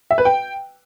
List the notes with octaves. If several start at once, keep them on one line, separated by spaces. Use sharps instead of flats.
E5
B4
G5